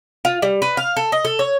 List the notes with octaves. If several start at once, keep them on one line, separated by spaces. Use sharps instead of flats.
F4
G3
B4
F5
A4
D#5
A4
C#5